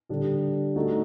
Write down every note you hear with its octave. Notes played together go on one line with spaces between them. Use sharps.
D3 G3 D4 A4
A3 D#4 F#4 A4